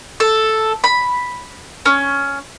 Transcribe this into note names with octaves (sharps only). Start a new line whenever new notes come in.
A4
B5
C#4